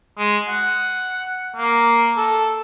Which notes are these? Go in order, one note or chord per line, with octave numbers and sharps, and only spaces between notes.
G#3
F#5
A#3
A4